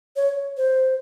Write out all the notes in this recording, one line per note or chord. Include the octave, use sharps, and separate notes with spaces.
C#5
C5